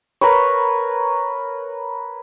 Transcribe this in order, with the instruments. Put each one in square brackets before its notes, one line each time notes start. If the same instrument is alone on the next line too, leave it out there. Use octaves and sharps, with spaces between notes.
[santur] A#4 B4 C#5